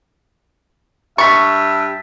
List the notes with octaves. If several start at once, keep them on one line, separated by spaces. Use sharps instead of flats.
G2 E5 C#6 A6 B6